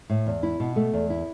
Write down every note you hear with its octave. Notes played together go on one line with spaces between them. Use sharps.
A2
E2
E4
B2
A3
E2
E4